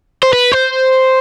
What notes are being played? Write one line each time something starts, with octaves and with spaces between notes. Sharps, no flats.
C5
B4
C5